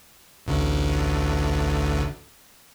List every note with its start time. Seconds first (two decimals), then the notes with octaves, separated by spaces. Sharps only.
0.47 A1 D2 D3